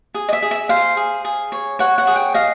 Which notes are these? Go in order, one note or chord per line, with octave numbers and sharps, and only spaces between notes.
G#4
D#5
E5
G#4
E5
C5 F5
G#4
G#4
C#5
C#5 F#5
F#5
G#4
G5
D#5 F5